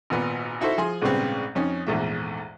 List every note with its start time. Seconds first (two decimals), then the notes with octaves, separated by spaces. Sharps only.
0.10 G#1 A#2 B3
0.61 D#4 E4 F#4 A4 C5 E5
0.78 F3 G#4 G#5 C6
1.01 A#1 G#2 C#3 G3 B3 C4
1.55 F2 C#4 D#4
1.87 A#1 E2 G#2 A3 E5